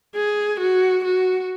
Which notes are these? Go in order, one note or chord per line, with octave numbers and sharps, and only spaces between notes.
G#4
F#4
F#4